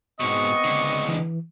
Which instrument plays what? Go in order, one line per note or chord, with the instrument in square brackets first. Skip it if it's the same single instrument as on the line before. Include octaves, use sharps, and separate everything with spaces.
[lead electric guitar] G#2 B2 [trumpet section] B3 C4 D#5 [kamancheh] C#6
[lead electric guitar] C#2 D3
[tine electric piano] E3